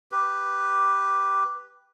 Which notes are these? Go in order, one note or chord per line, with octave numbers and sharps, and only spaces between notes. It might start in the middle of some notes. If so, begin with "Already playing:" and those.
G4 B4